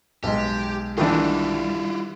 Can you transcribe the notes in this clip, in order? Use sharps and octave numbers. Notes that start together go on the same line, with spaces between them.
B1 G#3 G4
D#3 E3 G3 D4 E4 F4